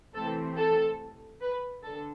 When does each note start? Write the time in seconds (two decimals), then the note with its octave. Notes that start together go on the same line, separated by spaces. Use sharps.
0.14 C3 E3 A3 C4 A4
0.57 A4
1.41 B4
1.83 D3 A4